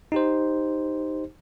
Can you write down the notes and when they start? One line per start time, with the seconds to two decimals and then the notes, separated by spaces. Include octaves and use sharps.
0.12 D#4 G4 C5